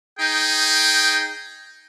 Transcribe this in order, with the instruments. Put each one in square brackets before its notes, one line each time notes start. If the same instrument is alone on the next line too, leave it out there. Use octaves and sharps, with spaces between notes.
[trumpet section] D#4 G#4 G5